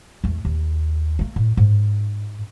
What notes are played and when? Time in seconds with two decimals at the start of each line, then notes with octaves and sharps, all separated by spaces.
0.24 E2 A3
0.45 D#2
1.19 A3 A#3
1.36 A2
1.57 G#2